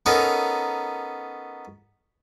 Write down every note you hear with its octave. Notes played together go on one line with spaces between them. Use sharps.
B3 C#4 D#4 A4 A#4